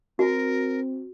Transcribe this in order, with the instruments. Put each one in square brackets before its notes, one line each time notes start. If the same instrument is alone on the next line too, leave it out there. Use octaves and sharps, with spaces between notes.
[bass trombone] C4 [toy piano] F#4 [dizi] A#4